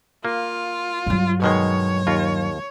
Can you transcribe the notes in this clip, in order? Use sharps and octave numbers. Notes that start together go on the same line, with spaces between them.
A#3 F4
G2 F#3
B2 D#3 G#3 C#5
D#2 F4 A#5